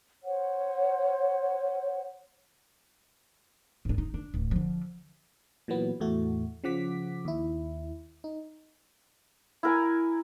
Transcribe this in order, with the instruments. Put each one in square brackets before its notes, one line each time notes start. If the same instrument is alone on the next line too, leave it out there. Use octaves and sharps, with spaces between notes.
[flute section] C5 C#5 F#5
[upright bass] G#2 D4
D#4
D4
D1
D3 F3
[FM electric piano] A#2 E3 F#3 B3
E2 A2 A3 F#4
C#3 F3 F#5 D6 B6
D#2 E4
D#4
[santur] E4 A#4 G#5